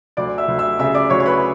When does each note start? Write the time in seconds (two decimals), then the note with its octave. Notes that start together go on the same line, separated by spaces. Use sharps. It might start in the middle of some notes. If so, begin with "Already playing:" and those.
0.17 D2 D5 D6
0.38 E5 E6
0.48 D2
0.58 E5 E6
0.79 C#3 E5 E6
0.94 D5 D6
1.10 D2 C#5 C#6
1.20 C#6
1.26 B4 B5